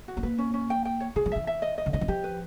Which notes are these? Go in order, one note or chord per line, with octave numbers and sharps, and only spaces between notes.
F#4
B3
A#3 B4
C#4
C#4
G5
G5
C#5
E3 G#4
F3
E3 E5
E5
D#5
D#5
D3
D#3 D#5
E3
F3 G4
B4